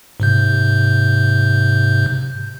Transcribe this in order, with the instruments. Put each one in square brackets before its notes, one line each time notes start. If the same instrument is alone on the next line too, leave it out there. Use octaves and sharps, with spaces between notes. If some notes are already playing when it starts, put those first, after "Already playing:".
[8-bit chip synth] G#2 C3 G6